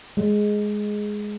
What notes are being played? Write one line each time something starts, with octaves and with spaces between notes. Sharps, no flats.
G#3